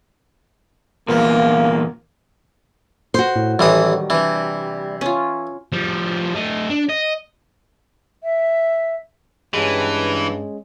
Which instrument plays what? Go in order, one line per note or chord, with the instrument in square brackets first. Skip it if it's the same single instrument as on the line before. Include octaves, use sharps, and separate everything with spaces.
[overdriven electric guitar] E2 A#2 [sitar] F3 B3 [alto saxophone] A#3
[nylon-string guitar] F#4 C5 [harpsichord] C6
[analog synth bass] A2
[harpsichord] A1 E3 D#6 [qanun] D#3 F#3 [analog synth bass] G3
[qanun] C3 D4 [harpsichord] E3
[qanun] C#4 F4
[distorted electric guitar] F3 G3
A3 D#5
D4
D#5
[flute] E5
[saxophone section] G2 [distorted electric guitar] E3 [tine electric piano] G#3 C#4